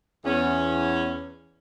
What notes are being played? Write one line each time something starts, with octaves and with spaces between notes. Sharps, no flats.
E2 C#4